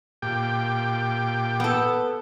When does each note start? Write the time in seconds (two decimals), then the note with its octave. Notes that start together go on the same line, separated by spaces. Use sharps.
0.22 A#2 G4 G5
1.60 B3 A4